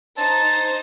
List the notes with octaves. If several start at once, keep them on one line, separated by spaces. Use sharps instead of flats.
D#4 C5 A5